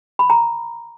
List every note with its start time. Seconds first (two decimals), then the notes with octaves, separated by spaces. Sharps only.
0.19 B5
0.30 A#5